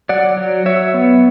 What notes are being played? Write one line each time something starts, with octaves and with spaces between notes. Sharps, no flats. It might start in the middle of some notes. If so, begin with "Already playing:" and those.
F#3 D5 F#5
F#3
F#3 C#5 E5
B3